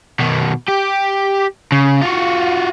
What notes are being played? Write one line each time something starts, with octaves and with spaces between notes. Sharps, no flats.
B2 D#3
G4
C#3
F4 F#4